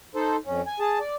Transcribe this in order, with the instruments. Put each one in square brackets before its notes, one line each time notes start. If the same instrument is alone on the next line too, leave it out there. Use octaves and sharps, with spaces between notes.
[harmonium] D#4 A4 C5
F2 C#4
G#5
G#4 A5
D5